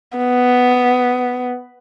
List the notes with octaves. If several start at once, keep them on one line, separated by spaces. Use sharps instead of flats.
B3